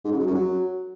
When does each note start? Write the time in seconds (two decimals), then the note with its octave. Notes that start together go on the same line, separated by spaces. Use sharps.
0.05 G#2
0.12 C#3
0.20 F#3
0.27 F#2
0.35 F#3